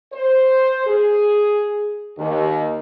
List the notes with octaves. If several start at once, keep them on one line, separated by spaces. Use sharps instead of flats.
C5
G#4
D#2